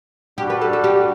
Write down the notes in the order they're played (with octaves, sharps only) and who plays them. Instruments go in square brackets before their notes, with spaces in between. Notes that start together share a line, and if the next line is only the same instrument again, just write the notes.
[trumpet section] G3 D4 F#4 [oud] G4
[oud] B4
A4
A4
G4